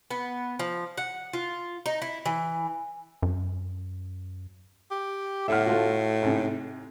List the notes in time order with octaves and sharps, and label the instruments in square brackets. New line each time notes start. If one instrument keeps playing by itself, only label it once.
[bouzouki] B3
F3
F#5
F4
D#4
E4
E3
[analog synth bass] F#2
[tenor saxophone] G4
[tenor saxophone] A2 [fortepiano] E5 F#5 F6
[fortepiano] A3 F4 F#4
G#2 C3